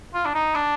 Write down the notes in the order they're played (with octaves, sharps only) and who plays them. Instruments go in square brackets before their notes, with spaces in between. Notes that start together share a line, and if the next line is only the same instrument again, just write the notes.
[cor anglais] F4
D4
D#4
D4